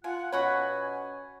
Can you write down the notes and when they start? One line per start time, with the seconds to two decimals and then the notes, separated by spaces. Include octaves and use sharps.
0.04 F4 F#5 G#5
0.32 B2 C#4 F#4 C#5 F#5 G#5 B5 C#6